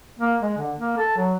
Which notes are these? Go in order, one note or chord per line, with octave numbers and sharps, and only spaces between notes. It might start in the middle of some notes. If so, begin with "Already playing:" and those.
A#3
G#3
D3
A#3
A4
F#3